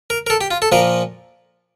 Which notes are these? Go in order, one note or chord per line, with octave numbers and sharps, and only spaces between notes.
A#4
A#4
A4
G4
F4
A4
A#2 F3 A#3 A#4